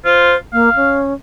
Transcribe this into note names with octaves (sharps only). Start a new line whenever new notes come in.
F4 C5
A#3 F5
C#4